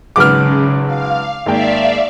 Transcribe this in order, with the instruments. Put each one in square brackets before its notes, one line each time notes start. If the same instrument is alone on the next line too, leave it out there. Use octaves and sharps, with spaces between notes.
[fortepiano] G#1 F#3 B4 [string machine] C#3 [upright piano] D6 F6
[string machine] F5
[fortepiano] G#1 A#3 G5 [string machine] D5 E5 F5